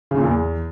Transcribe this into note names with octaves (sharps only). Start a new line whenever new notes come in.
C#3
A#2
E2